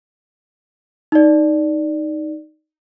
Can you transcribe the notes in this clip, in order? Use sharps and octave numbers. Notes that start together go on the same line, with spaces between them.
D#4 D5